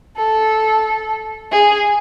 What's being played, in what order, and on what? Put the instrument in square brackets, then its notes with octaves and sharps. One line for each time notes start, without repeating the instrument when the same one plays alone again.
[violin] A4
G#4